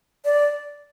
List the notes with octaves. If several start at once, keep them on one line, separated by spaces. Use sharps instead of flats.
D5